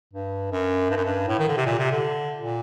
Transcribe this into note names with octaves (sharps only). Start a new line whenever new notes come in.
G2
F#2
G2
F#2
G2
A2
D#3
D3
C3
A#2
C3
D3
A#2